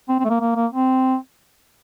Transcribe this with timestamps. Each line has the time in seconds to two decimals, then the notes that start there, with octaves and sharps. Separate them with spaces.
0.09 C4
0.20 C4
0.25 A3
0.30 A#3
0.41 A#3
0.56 A#3
0.72 C4